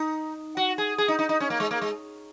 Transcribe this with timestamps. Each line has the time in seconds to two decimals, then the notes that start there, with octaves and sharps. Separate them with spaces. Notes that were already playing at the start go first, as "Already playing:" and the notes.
Already playing: D#4
0.57 F#4
0.78 G#4
0.98 G#4
1.08 D#4
1.19 D#4
1.29 D#4
1.40 C#4
1.50 A#3
1.60 G#3
1.71 A#3
1.81 G#3